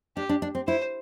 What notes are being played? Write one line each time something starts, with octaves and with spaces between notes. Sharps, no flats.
D4 G4
D4
D4
C4
E4 C5